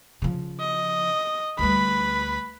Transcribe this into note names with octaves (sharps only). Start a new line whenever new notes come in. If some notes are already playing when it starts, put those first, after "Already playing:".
C#3 F3
D#5
D2 G3 B4 B5